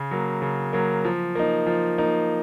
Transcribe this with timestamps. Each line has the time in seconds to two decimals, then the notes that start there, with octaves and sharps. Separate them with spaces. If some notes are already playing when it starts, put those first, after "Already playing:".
Already playing: C#3
0.11 F#3 A#3
0.42 C#3
0.73 F#3 A#3
1.05 F3
1.35 A#3 D#4
1.67 F3
1.98 A#3 D#4